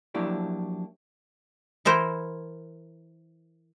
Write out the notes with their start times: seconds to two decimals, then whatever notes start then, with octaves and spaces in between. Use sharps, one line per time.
0.14 F3 F#3 A#3 D4 E4 G4
1.85 E3 E4 A#4 C5 E5